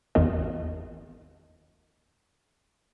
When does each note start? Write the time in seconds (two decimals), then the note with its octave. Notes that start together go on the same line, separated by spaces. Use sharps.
0.15 G#1 E2 D#3 D#5